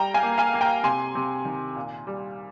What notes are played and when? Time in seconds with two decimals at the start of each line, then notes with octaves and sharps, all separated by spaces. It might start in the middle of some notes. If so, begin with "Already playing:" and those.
Already playing: G3 G5 A#5
0.14 F5 G#5
0.23 A#3
0.38 F5 G#5
0.54 A#3
0.61 G5 A#5
0.84 C3 G#5 C6
1.15 C3
1.45 D#3
1.76 A#2
2.07 G3